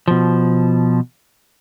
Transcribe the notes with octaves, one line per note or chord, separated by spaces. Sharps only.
B2 F3